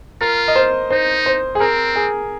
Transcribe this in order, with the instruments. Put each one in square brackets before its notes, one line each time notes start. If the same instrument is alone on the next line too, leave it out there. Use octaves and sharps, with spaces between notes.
[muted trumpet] F4 [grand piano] A#4
[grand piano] D#5
C5
[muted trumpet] D#4 [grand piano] C5
[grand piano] C5
G#4
[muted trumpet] C4 [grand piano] A#4
[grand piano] G#4